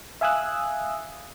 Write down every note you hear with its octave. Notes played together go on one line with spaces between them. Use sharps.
E5 F5 G#5 D#6 E6 F#6